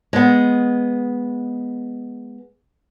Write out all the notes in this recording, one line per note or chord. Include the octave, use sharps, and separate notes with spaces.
G#3 B3